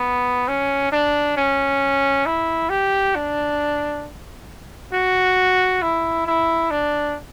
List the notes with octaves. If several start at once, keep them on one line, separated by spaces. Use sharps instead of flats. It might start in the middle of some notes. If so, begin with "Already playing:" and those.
Already playing: B3
C#4
D4
C#4
E4
G4
D4
F#4
E4
E4
D4